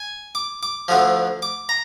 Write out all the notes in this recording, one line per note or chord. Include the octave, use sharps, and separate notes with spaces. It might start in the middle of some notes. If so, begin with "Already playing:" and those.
Already playing: G#5
D6
D6
D2 D3 F3
D6
A#5